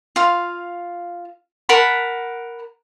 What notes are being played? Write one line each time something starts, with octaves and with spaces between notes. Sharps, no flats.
F4 F5
A#4 F#5 A5 B5